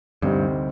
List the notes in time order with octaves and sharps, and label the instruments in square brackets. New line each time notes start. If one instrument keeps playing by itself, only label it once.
[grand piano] D2 C3 G3 C4 D#4 [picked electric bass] G2